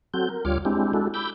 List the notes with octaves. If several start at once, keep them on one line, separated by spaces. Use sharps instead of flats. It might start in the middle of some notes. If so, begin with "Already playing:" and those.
F#3 C4 F#4 A4 G6
A#4
D2 G3 F4 C#5 D6 F6
G#3 C4 D4 E4 G4
G#3 D4 E4 F#4 A4
B5 D6 E6 G6